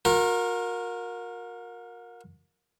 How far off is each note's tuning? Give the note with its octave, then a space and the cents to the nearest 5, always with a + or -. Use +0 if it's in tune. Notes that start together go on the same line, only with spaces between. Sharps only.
F#4 -45 A#4 +0